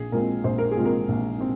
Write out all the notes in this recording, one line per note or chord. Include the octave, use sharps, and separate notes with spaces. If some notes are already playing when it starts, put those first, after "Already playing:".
Already playing: A#1 G#4
A#2 F3 G#3 C4 A#4
A#1 C5
A#4
G#4
A#2 F3 G#3 C4
A#4
A#1
C4